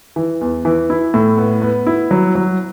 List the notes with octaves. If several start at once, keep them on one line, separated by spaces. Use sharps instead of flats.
E3
E2
E3
E4
A2
B3
B3
E4
F#3
F#3